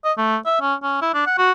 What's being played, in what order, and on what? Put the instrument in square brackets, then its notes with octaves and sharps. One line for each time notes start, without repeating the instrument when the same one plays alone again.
[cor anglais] D#5
A3
E5
C#4
C#4
E4
D4
F#5
F#4